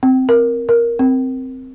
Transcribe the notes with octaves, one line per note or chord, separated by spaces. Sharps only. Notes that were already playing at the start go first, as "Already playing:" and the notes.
C4
A#4
A#4
C4